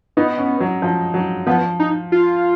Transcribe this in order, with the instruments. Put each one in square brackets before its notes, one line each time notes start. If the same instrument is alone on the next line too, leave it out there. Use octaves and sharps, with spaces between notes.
[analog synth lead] B3 [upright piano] D#4
[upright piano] C#4
F#3
F3
F#3
[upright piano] F3 [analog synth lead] B3
[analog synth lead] D#4
F4